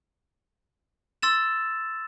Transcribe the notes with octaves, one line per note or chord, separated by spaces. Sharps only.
C6 E6 A6 E7